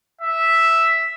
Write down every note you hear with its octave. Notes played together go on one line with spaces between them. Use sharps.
E5